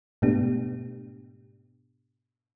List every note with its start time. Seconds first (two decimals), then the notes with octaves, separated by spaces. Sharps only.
0.22 G#2 B2 A3 B3 D4 G4